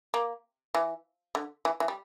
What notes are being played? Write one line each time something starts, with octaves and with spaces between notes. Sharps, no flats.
A#3
E3
D3
E3
E3
G3